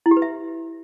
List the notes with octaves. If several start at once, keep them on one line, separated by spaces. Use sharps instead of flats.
E4
G4
B4
E5